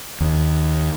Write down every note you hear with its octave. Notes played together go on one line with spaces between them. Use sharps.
D#2